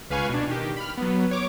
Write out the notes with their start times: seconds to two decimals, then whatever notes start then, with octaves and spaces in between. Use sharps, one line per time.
0.10 C#2 B4 F5 G#5 C#6
0.29 B2 D4
0.47 D#3 G4
0.77 B5 F6
0.97 F#3 B3
1.31 C#5 D6